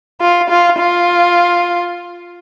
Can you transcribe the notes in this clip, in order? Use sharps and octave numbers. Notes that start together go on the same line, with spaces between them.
F4
F4
F4